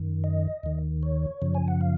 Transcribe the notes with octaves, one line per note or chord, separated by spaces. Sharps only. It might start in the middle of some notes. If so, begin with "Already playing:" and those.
Already playing: F#2 D#3
D#5
D#2 D#3
C#5
F#2 C#3 F3
G#5
F#5
F5